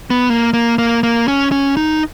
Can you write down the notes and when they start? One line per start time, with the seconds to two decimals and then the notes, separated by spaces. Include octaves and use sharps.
0.10 B3
0.30 A#3
0.53 A#3
0.78 A#3
1.03 A#3
1.28 C#4
1.52 C#4
1.77 D#4